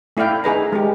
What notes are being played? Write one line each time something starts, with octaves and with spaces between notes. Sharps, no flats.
A3 E4 D5 F5 G5
D#4 G#4 B4 A#5
G#3 G4